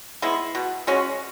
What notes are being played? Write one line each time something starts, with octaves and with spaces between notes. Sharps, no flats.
G#3 B3 E4
B2
G#3 C#4 F#4